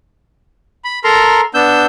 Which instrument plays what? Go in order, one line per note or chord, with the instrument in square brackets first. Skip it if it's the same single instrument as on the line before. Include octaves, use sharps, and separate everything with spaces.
[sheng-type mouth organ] B5
A4 A#4 A#5 C6
B3 D4 E6 G6